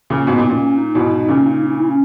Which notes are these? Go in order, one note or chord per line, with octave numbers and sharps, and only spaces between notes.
A#2 C#3
G#2 B2 B3
A#2 B3
A#2 C#4
C#4
D#4
G#2 B2 E4
D#4
A#2 C#3 C#4
D#4
C#4
D#4
E4
C#4